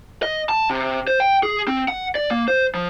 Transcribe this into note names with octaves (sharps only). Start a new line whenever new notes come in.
D#5
A5
C3
C5
G5
G#4
C4
F#5
D5
A#3
C5
F3